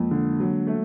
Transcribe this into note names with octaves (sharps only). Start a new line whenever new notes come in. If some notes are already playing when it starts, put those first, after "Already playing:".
Already playing: F2 G#3 A#3
D3
F#3
A3